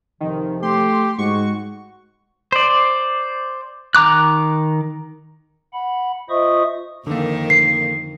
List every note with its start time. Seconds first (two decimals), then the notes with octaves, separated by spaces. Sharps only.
0.21 F2 C3 D#3 F3
0.63 A3 G4 C6
1.19 G#2 G#3 F#4 C#6
2.52 C5 D5
3.95 D#3 A#5 D6 F#6
5.73 F#5 B5
6.30 F4 C5 D#5 E5 C#6 D#6
7.07 F2 D3 D#3 A#3
7.50 C7